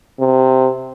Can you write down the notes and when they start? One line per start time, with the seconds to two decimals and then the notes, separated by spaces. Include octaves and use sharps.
0.19 C3